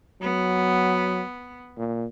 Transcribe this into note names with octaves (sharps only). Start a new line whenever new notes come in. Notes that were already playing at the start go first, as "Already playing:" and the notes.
F#3 B3
A#2